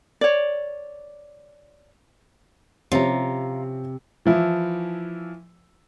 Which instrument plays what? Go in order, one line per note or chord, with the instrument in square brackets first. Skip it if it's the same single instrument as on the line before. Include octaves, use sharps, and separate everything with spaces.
[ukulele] C#5 D5
[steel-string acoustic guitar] C3 [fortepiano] F3 C4 C#4 [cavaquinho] F4 A#5
[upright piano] E3 F3 E4